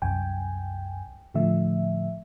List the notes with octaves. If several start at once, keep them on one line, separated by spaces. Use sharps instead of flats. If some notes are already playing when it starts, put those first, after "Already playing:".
C2 F#2 G5 G#5
A2 D3 F3 A3 E5